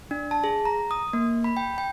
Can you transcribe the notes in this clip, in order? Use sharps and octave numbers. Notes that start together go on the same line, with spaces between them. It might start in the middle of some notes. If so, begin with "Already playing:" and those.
D4
A5
G#4
A#5
D#6
A#3
B5
G5
G5